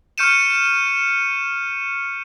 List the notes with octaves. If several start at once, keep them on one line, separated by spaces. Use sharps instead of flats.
C#6 F6 G6 C#7 D#7 E7